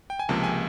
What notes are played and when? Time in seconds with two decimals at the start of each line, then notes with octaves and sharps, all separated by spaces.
0.10 G5
0.19 G#5
0.29 C#2 C3 F3 A#3 A5
0.43 G#5